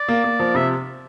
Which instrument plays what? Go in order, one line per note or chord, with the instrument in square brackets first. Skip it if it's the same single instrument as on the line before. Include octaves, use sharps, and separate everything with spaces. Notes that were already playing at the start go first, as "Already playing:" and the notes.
Already playing: [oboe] D5
[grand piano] A#3
A#3
F3
[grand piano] C3 [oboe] E5